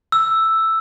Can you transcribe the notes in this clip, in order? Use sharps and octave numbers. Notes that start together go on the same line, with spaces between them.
E6